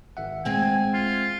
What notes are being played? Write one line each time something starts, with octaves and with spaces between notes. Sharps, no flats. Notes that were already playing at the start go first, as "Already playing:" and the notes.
G#1 E5 F#5
G#3 C4 G#5
F4